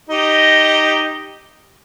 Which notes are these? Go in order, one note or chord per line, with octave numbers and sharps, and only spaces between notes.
D#4 G4 D#5